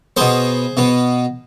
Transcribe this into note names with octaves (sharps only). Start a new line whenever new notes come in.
B2 B3 G#4 C5
B2 B3